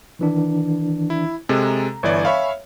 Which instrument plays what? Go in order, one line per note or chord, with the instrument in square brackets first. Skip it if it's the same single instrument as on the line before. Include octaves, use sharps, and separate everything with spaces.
[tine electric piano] D#3 E3 D4
[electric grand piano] E4
C3 G#3 A4
[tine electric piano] A#5
[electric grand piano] G1 E3 D5 [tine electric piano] C#5 E5
[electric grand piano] C#5 E5 F5 [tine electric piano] G#5 B5 C#6